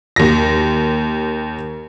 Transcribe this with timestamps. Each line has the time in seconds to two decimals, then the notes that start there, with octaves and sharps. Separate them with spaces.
0.16 D#2 A#6